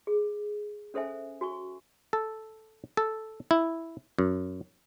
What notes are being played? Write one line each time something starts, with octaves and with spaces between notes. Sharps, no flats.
G#4
C#4 A4 C5 E5 G#5
F#4 G#5 C#6
A4
A4
E4
F#2